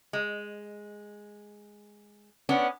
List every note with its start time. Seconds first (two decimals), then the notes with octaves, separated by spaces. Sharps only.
0.13 G#3
2.49 B3 C#4 D4